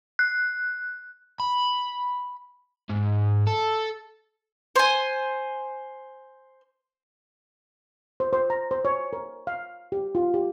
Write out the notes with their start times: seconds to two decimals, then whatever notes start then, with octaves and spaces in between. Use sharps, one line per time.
0.19 F#6
1.40 B5
2.89 G#2
3.47 A4
4.76 C5 G#5
8.20 C5
8.33 C5
8.50 A#5
8.71 C5
8.85 C#5
9.13 A#4
9.47 F5
9.92 G4
10.15 F4
10.34 G4